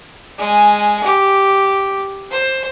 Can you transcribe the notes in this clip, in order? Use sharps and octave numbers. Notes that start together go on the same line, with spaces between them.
G#3 G#5
G4
C5